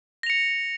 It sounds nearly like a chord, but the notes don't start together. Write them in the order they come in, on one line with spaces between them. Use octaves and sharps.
A#6 F7 C#7